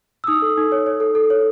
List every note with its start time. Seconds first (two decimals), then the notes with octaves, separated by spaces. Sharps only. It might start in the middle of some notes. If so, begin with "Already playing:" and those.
0.24 E6
0.27 D#4 D#6
0.42 A4
0.57 D#4
0.72 C#5
0.86 C#5
1.00 A4
1.15 A4
1.30 C#5